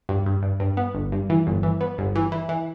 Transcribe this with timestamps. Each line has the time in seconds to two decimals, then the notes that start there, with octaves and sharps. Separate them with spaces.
0.09 G2
0.26 G2
0.43 G2
0.60 G2
0.77 B3
0.94 G1
1.12 G2
1.30 E3
1.47 G1
1.63 E3
1.81 B3
1.98 G1
2.15 E3
2.32 E3
2.49 E3